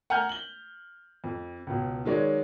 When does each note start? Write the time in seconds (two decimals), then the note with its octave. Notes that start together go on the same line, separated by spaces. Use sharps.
0.10 F#5 G#5 A#5 F6 G6
0.29 F#7 G7
1.24 F2
1.67 C#2 B2
2.05 D#3 F#3 G#3 C#5 D5